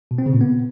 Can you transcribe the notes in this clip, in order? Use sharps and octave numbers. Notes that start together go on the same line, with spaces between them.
B2
C4
C#3
A#2
B3